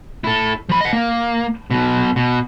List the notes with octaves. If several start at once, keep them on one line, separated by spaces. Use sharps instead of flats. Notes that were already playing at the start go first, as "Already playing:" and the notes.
E4 A4
F3 B5
D#5 F#5
A#3
B1 B2
B2